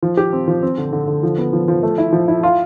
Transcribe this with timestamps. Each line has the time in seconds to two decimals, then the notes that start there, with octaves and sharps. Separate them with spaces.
0.03 F3
0.17 G4
0.33 C4
0.48 F3
0.63 C4
0.78 D3
0.92 D3
1.07 D3
1.23 F3
1.38 B3
1.53 F3
1.68 F3
1.83 A3
1.98 E4
2.13 F3
2.28 E4
2.43 F4